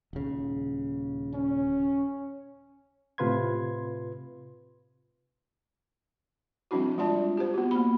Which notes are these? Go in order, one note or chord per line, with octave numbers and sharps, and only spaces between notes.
D#1 C#3
C#4
A2 C3 F4 B4 C6 G#6
F3 G3 C4 D4 E4 F#4
G#3 F4 D5 A5
G4 C5
B3 F#4
A#3 B5